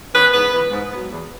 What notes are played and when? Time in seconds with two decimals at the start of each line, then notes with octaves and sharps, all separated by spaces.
0.13 E3 B3 C#4 B4
0.32 G#2 B3 B4
0.52 E3 B3
0.71 G#2
0.91 F#3 B3
1.10 E2